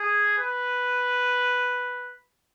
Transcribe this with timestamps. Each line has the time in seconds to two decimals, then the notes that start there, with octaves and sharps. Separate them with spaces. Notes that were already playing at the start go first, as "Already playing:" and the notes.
Already playing: G#4
0.38 B4